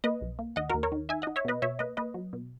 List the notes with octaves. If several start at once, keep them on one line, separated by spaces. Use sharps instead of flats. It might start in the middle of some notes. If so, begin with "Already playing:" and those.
A#3 B4 D#5
B1
A#3
D#2 D#5 F#5
D#2 F#4 A#4
A#4 C#5
D#3
D#4 E5 G#5
D#4 D#5 F#5
C#5 E5
B2 B4 D#5
B2 C#5 E5
A#3 B4 D#5
A#3 B4 D#5
F#3
B2